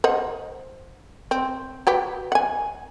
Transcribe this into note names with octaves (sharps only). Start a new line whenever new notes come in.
C5 D#5 F#5
C4
F#4 G4 B4
F#5 G#5